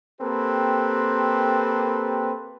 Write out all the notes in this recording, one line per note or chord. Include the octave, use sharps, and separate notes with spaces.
A#3 C4 G4 A4 B4